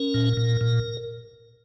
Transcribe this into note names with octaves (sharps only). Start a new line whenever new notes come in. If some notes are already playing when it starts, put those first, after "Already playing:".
Already playing: C#4 A#4
A#2
A#2
A#2